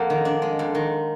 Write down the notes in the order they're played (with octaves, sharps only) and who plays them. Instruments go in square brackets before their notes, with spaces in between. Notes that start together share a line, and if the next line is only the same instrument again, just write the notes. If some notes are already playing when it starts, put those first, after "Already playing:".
Already playing: [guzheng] F2 A#3 [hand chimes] F#5
[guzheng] D#3
D4
G#3
F2
D#3